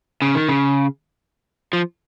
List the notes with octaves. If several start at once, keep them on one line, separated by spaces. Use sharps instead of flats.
C#3
D#3
C#3
F3